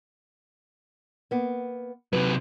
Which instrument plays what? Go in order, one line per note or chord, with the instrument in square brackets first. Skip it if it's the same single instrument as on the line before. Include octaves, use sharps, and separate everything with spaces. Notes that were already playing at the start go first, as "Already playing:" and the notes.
[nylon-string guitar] A#3 B3
[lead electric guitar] C3 F#3 [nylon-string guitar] B4